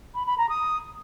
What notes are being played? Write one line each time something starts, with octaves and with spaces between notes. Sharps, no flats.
B5
B5
A#5
D#6